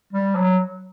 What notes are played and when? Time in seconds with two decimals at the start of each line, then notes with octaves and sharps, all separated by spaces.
0.13 G3
0.35 F#3